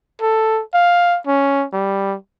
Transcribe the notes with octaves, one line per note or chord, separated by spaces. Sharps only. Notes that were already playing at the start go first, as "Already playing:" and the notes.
A4
F5
C#4
G3